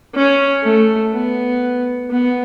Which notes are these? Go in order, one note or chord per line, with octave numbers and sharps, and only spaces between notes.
C#4
A3
B3
B3